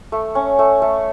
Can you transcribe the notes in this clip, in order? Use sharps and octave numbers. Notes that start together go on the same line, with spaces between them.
A3
C#4
A3
A3